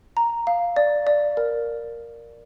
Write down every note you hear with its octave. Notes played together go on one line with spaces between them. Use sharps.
A#5
F5
D5
D5
A#4